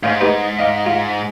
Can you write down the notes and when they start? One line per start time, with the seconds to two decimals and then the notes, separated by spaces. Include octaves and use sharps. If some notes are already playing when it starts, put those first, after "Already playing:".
0.03 G#2 C#4 C5 F5
0.21 B3 D#4 G4
0.59 D#5 F5 D6
0.86 F4